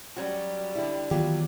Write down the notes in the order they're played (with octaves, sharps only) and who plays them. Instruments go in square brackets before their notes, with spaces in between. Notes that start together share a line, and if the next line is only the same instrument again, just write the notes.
[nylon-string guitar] F#3 C#4 F#4 [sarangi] G3
[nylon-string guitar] D3 E4
[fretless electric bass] D#3 E3 B3 [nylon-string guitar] F#3 F4 G4